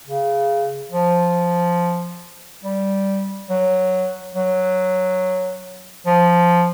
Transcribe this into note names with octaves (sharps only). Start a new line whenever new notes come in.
C#3
F3
G3
F#3
F#3
F3